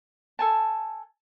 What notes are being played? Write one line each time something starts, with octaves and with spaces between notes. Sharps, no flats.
A4 G#5 A5